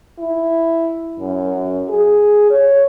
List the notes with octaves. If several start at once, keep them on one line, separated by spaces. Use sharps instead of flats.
E4
F#2
G#4
C#5